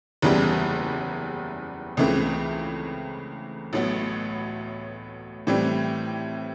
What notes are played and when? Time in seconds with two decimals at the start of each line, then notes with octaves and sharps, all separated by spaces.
0.22 F#1 E2 C#3 E3 G3
1.97 C#2 C#3 E3 A3 C4
3.73 A1 A2 F#3 B3
5.47 A2 E3 G3 C4